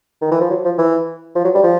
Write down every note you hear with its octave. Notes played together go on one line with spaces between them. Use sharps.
D#3
E3
F3
F#3
F3
E3
F3
F#3
G3
F3